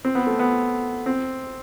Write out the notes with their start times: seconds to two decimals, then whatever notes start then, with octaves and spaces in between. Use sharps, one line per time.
0.05 C4
0.15 B3
0.27 A3
0.39 B3
1.06 C4